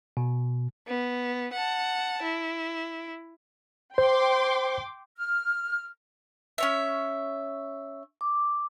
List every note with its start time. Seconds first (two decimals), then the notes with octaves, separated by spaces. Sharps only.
0.17 B2
0.87 B3
1.53 F#5 A5
2.22 E4
3.98 C5 G5 C6 D6
5.16 F6
6.58 C#4 C#5 E5
8.21 D6